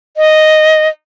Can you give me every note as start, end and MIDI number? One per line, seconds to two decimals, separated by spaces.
0.17 0.88 75